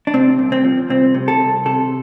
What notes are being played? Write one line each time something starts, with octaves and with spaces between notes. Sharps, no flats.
D4
C3 C4
C2
C4
F3
C2 C4
C3
A4
C2
C3 A4